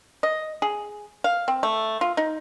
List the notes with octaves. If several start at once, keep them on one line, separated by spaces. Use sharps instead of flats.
D#5
G#4
F5
C4
A3
F4
D#4